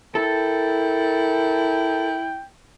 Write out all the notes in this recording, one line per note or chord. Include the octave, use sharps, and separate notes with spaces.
E4 A4 A#4 G5